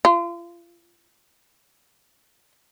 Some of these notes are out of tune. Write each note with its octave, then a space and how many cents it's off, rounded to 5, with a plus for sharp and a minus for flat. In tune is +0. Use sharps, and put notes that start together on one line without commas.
F4 -35